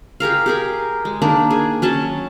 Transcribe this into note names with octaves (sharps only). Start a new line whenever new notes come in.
G4 G#4 A#4 F5
G4 G#4 A#4
G#3
D#3 A#3 D4
G#4
F#3 C#4 A5